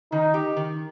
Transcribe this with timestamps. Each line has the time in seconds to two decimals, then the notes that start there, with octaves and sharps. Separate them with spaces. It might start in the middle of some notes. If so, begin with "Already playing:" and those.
0.12 D#3 D#4
0.34 G4
0.57 D#3